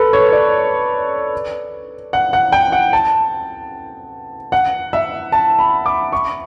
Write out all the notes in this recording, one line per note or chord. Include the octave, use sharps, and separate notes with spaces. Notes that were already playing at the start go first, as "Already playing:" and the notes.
Already playing: A4 B4
C#5
D5
F#5
F#5
G5
F#5
A5
F#5
E5
A5
B5
D6
C#6